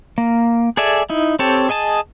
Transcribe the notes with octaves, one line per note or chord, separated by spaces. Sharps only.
A#3
G#4 A4 D5 E5 G#5
D#4 E4
C4 G4 A4 C#5 A5
G#4 D#5 G#5 A5